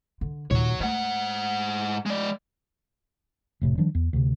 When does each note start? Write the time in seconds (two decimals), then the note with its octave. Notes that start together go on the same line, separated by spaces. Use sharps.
0.21 D3
0.51 D#2 A#2 F#3 C#5
0.80 G#2 A3 F#5
2.06 G#3 D5
3.61 F1 A2 C3
3.78 D#3 F3 G3 D4
3.95 E2
4.13 D2 C3